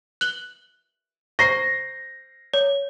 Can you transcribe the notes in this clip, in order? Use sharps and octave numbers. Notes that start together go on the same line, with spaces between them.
F#6 F#7 G7
C5 A#5 C#6 A#6 C7
C#5